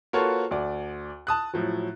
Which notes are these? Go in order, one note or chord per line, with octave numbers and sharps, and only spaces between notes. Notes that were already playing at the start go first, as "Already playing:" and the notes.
A#3 F4 F#4 A4 B4 C#5
D2 D5
A5 D#6 F#6
A2 F3 F#3